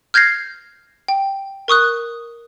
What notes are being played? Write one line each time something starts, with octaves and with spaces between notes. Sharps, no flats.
F6 G6 G#6 A#6 C7
G5
A#4 C#6 D#6 F#6